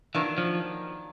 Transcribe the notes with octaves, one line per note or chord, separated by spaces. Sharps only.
D#3 E3 F#3 A#3 D4
F3